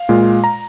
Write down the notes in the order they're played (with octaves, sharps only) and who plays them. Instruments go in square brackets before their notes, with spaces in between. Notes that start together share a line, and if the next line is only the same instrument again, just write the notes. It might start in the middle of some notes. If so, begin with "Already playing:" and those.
Already playing: [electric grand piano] F5
A#2 G#3 F4
A#5